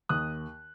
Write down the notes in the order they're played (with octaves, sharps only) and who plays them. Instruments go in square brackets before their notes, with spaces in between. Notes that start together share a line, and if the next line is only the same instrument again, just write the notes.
[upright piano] D#2 D#6 F#6